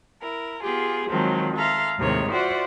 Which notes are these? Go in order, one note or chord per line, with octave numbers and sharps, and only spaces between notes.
E4 A#4
B3 F4 G4 G#4
D#3 F3 F#3 G#3 C4
A4 E5 F5 A#5 C6
D#2 A2 C3 D#3 G#3 C#5
F4 F#4 C5 D5 E5 F#5